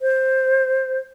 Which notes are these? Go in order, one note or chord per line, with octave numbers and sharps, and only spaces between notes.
C5